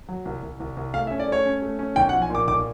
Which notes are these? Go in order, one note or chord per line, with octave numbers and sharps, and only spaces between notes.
F#3
C2
C2
C2
C2
A3 F5
E5
C#4
D5
A3 C#5
C#4
A3
C#4
B1 G5
F#5
F3
G#5
A#2 D6
B1 D6